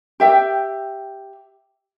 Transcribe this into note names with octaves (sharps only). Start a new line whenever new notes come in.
G4 E5 G5